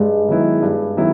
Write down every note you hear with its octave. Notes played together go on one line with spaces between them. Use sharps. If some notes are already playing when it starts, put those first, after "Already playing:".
Already playing: G2 G#3
D#3 F#3 B3 E4
G2
D#3 F#3 B3 E4